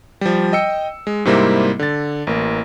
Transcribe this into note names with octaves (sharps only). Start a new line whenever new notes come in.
F3 G3
D#5 G5 E6 C#7
G#3
G#2 C3 G3 A#3 C4 E4
D3 A6
A1 A#3